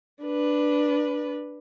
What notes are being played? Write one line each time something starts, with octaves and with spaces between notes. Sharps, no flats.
D4 B4